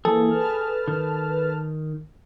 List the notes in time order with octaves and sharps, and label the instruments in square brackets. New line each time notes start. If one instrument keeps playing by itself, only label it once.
[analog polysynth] E3 A#3 [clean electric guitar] G#4 [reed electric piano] A4
[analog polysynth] B4 A5 F6
[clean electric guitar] D#3